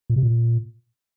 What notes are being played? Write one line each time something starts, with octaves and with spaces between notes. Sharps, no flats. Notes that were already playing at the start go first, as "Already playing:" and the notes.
A#2
C3
A#2